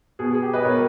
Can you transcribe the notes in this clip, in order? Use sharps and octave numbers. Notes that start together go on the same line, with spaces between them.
B2 G#4
G#4
G4
B4 D#5
B2 A#4 C#5